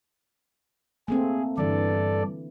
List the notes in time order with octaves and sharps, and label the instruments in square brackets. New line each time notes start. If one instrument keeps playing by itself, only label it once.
[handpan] A3 A#3 C4 [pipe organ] G#4
[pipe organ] G2 A4 D5 [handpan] D3 E3